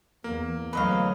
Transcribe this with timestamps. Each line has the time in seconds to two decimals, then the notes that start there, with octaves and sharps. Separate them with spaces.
0.24 E2 A#3
0.73 D2 F#3 B4 D#5 F5